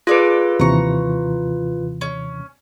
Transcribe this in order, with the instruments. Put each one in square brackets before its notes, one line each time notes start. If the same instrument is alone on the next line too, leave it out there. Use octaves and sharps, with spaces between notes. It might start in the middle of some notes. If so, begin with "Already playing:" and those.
[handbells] F4 B4 [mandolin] G#4 A4 D5
[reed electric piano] D#2 C3 E3 [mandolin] A#5 C#6
[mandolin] C#4